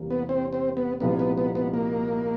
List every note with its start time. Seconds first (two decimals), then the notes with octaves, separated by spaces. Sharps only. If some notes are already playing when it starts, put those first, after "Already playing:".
Already playing: E2 C3 E3 G3 A#3
0.10 B3
0.29 C4
0.53 C4
0.77 B3
1.00 C2 A#2 F3 G#3 B3
1.19 B3
1.38 B3
1.55 B3
1.74 A#3